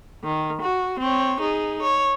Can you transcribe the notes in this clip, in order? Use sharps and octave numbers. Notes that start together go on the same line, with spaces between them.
D#3
F#4
C4 C#5
D#4 G#4
C#5